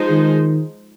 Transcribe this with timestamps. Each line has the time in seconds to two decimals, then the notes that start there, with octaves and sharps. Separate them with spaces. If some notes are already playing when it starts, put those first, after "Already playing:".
Already playing: F3 G#3 D#4 G#4 C5
0.11 D#3